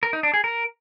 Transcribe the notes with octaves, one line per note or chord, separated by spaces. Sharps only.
A#4
D#4
D4
G#4
A#4